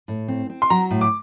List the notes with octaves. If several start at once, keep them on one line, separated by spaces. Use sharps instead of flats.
A2
C4
C4
C6
F#3 A#5
A2
D6